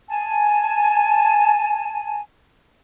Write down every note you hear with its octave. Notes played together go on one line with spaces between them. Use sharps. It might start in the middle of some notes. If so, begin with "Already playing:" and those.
G#5 A5